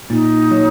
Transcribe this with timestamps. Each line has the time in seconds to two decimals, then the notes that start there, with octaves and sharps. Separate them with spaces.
0.10 A#2 D#4
0.51 F#3